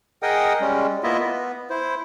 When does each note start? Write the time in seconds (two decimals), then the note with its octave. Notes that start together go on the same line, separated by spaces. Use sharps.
0.23 G#4 A#4 D#5 F#5 G5 D#6
0.61 G3 G#3 C#4
1.03 A#3 B3 E4 F4 D#5 E5
1.18 B3
1.70 E4 C5